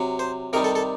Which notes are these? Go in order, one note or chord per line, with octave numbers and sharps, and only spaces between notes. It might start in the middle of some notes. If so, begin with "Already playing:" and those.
Already playing: C3 F#3
C5
C3 D#3 G3 A#4
A4
A4